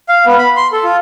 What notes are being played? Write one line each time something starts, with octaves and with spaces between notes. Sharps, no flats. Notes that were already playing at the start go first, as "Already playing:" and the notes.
F5
B3
B5
C6
A4
F4